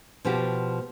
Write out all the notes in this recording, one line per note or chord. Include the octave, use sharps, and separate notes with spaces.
B2 F3 F#4 G4